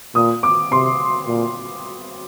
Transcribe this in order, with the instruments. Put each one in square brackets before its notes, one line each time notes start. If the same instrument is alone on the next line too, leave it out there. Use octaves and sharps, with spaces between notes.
[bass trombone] A#2 [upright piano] D#6
[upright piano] D6
[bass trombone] C3 [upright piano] C6
[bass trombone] A#2